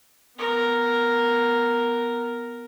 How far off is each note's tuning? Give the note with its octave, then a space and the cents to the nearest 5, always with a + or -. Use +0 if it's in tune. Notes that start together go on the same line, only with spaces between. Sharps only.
B3 +0 A#4 +0